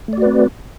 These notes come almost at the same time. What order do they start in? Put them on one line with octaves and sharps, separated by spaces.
A3 D5 F#4 B4 C4